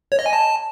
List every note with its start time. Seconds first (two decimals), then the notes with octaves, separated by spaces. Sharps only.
0.12 C#5
0.19 D#5
0.26 G#5
0.33 A5